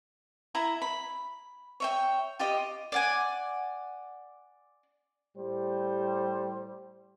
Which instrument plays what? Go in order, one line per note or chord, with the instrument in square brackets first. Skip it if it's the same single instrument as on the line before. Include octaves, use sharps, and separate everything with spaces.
[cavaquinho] E4 E5 A#5
B5
C#5 E5 G5
F4 G4 D#5
[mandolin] D5 F#5 G#5
[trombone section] A2 G3 C5